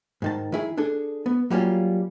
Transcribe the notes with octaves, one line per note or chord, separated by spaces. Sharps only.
G#2 D#3 A5
D#3 E4 G#4
D4 G#4 A4
B3
F#3 G3 A#3 C#4 F4